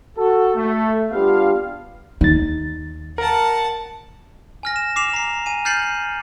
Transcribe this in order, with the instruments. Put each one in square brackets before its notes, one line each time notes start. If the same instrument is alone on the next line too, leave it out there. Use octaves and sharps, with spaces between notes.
[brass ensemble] F#4 A4
A3
G3 B3 D4 F4 G4 F5
[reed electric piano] D#2 A6 [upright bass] D#4
[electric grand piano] A#4 [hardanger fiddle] F#5 A5
[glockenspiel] G#5 F6 A#6
E7
D6 C7 E7 F7
A#5 C7
G#5 D#7
F6 G6 A6 C7 C#7 F#7